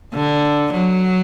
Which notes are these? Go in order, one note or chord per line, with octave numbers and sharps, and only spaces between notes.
D3
F#3